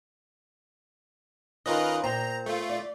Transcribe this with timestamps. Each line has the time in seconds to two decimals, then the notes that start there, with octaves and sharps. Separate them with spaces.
1.66 D#3 C#4 F4 A#4 B4 D#5
2.04 A#2 C5 G5 A#5
2.46 A3 F4
2.69 D5